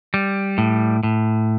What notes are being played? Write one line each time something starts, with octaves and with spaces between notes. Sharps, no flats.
G3
A2
A2